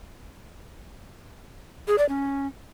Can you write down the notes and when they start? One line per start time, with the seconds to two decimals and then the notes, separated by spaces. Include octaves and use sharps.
1.88 G#4
1.98 D5
2.09 C#4